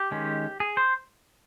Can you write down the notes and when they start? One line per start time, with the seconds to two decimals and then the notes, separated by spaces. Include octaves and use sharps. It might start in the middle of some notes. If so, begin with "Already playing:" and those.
Already playing: G4
0.11 D#3 G#3 C#4
0.60 G#4
0.77 C5